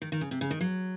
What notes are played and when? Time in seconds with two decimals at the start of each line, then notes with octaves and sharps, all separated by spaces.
0.02 D#3
0.12 D#3
0.21 C#3
0.31 C3
0.41 C#3
0.51 D#3
0.61 F#3